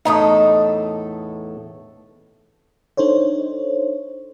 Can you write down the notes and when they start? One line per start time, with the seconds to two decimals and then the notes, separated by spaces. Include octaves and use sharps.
0.05 E2 A2 D#4 A4 D#5
2.97 D4 D#4 A4 C5 C#5